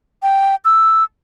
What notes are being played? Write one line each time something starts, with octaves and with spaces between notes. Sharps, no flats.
G5
E6